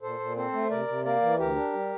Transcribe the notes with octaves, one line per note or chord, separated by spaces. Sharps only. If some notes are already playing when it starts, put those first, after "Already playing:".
A#2 A4 C5
A#2
C4 A4 C5
A3
C3 A#4 D5
C3
A#3 A#4 D5
E3
D2 G4 A#4
D4
G3